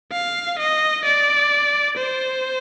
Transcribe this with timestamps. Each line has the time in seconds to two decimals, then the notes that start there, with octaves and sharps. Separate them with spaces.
0.12 F5
0.59 D#5
1.05 D5
1.98 C5